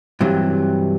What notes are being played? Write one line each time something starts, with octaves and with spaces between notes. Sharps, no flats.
G2 C3 E3 F#3